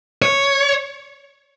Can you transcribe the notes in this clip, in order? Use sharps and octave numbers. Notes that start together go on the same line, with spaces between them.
C#5